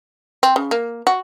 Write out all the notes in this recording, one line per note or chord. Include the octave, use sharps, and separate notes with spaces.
C4
C#3
A#3
F#4